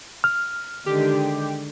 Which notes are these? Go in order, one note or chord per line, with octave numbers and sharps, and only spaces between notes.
F6
D3 D#3 G#3 G4